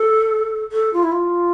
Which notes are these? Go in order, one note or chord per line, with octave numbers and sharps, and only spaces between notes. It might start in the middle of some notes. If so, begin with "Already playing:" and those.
Already playing: A4
A4
F4
E4
F4